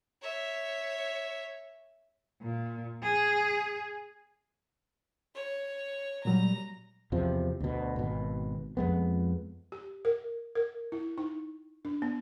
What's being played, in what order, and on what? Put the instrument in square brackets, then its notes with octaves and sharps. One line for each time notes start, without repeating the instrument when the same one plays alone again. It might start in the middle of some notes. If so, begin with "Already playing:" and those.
[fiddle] C#5 E5
[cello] A#2
G#4
[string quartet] C#5
[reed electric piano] A#2 F#3 G3 [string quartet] A#5
[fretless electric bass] E2 C3 F3
D2 B2
G#1 B2
F2 G#3 B3
[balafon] G4
A#4
A#4
E4
D#4
D4
B3